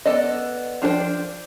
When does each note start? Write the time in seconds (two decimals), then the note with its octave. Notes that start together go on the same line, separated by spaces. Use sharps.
0.05 B3 A4 D5 D#5
0.82 F3 D4 G#4 C5 G5